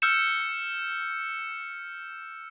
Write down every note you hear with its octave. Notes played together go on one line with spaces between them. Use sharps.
E6 F6 G6 C#7 E7